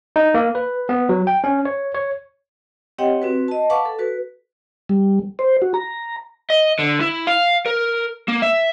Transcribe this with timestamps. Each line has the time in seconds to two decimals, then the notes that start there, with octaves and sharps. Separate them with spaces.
0.16 D#4
0.34 A#3
0.55 B4
0.89 B3
1.09 F#3
1.27 G5
1.44 C#4
1.65 C#5
1.94 C#5
2.98 C4 G4 C#5 D#5 F#5 G5
3.22 C4 F#4 B4
3.48 D#5 A5
3.70 B4 F5 F#5 A5 C#6 D6
3.85 A4
3.99 F#4 B4
4.89 G3
5.39 C5
5.62 F#4
5.74 A#5
6.50 D#5
6.79 D3
7.01 E4
7.27 F5
7.66 A#4
8.28 A#3
8.42 E5